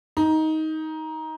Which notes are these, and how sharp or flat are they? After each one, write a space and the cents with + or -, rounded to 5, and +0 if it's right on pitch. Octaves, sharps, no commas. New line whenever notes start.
D#4 +15